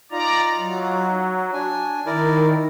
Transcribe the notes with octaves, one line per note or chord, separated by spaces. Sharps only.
D#4 F4 D5 A#5
F#3
D4 G#5
D#3 E4 A#4 D5